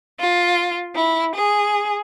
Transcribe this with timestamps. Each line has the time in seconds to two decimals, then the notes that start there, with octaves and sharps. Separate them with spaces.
0.18 F4
0.96 E4
1.35 G#4